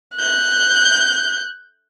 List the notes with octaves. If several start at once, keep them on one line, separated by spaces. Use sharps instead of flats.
F#6 G6